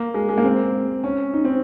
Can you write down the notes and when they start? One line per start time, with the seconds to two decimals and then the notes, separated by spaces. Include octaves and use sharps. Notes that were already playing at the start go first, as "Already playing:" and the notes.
Already playing: A#3
0.14 G#3
0.29 G#3
0.38 A#3
0.44 C4
1.04 C#4
1.34 D#4
1.45 C4